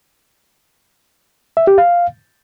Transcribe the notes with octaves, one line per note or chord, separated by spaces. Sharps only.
E5
G4
F5